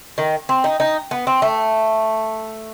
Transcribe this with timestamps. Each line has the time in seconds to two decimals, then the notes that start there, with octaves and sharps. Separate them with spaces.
0.18 D#3
0.49 C4
0.64 D#4
0.80 D#4
1.11 B3
1.27 C4
1.42 A3